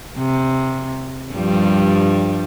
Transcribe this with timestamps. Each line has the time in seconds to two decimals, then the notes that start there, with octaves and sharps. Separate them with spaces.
0.18 C3
1.34 G2 F3 G3